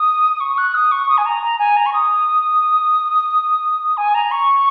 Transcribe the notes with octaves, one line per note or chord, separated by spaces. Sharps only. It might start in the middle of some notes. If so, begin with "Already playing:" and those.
Already playing: D#6
D#6
C#6
F#6
D#6
C#6
D#6
G#5
A#5
A#5
G#5
A#5
C#6
D#6
G#5
A#5
C#6